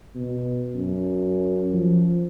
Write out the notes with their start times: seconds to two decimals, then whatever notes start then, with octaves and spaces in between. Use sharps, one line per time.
0.15 B2
0.74 F#2
1.74 F3